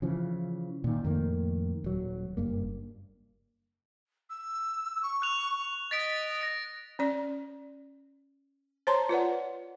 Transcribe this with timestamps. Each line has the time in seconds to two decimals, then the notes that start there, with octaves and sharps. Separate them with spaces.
0.02 C#3 E3 F3
0.84 A#2 D#3
1.04 F2 A2 D#3 A#3
1.84 D#1 F#3
2.37 F#1 G2 A#3
4.30 E6
5.03 C#6
5.22 F#6 F7
5.91 D#5 A6 B6 D7
6.41 A#6 D7
6.99 C#4 D5
8.87 C5 C#5 A5 A#5 C6
9.09 F4 B4 D5 F#5